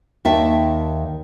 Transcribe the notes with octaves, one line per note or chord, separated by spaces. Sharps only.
D#2 D#3 E5 A5